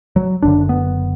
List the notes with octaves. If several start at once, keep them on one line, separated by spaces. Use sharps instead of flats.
F#3
F#1 F#2 D3 D4
B3